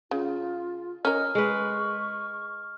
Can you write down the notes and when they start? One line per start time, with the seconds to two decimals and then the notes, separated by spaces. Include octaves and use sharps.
0.11 C#3 F4
1.05 C#4 A#4 D#5 F6
1.35 G#3 B4 C#6